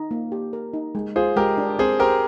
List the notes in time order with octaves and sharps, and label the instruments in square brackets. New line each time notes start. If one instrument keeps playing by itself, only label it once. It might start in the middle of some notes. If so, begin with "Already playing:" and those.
Already playing: [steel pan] D#4
A#3
G4
A#4
D#4
G#3
[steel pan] F4 [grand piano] G#4 C5
[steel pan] G#3 [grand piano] G4 A#4
[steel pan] D4
[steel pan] C4 [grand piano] G#4 C5
[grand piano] G4 A#4 [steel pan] C5